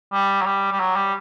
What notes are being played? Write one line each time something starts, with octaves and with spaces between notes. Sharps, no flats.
G3
F#3
G3
G3
F#3
G3